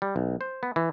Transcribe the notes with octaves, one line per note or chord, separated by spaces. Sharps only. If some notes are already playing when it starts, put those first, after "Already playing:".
G3
B1
C5
B3
E3